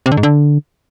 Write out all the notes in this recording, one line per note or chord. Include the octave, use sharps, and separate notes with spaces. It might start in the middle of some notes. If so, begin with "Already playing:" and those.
C3
D3
G#2
D3